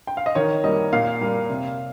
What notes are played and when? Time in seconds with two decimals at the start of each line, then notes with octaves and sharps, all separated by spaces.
0.07 G5
0.17 F5
0.26 D#5
0.35 D#3 C#5
0.64 G3 A#3 D#5
0.93 A#2 F5
1.21 G3 A#3
1.49 C3